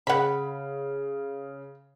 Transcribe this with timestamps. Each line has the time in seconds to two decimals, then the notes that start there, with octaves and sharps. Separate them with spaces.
0.07 C#3 F#5 B5